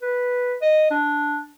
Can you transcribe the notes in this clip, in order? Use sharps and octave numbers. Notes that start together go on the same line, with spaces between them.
B4
D#5
D4